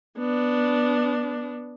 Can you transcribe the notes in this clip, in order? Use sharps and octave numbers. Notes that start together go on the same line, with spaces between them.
B3 D4